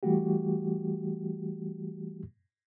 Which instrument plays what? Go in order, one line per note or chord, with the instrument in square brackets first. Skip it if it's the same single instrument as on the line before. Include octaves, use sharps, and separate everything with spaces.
[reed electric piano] E3 G3 A3 F#4 G4